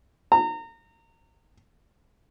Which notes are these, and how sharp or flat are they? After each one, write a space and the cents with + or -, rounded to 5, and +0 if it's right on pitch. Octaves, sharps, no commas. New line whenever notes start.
A#5 -30